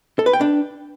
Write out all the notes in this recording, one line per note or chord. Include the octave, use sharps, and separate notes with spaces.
A4
B4
G5
D4